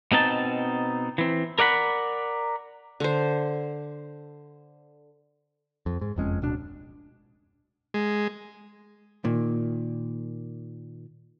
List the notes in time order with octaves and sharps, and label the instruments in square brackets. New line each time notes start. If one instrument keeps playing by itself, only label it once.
[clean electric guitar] B2 C4 D#4 A5
E3 C4
A#4 D5 F#5 B5
[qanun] D3 C5
[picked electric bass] F2
G#2
F#1 F2 G#3 C#4
D1 B2 D4
[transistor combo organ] G#3
[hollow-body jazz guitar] A#2 D#3